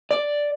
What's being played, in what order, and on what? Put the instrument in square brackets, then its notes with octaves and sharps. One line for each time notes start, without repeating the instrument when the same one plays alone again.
[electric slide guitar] D5